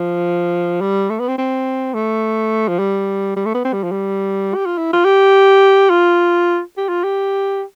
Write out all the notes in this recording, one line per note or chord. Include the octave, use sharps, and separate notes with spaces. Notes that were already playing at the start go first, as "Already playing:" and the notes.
Already playing: F3
G3
A3
B3
C4
C4
A3
F3
G3
G3
A3
B3
C4
G3
F3
G3
G4
F4
E4
F4
G4
F4
G4
F4
G4